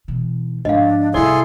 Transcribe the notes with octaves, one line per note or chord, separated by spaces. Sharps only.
B2 E3
G#2 F3 D4 D#5 F5
C3 G3 E4 G#4 A4 D5 C6